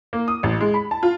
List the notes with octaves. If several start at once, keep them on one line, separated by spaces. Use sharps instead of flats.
A#3
D#6
A1
G#3
B5
A5
F4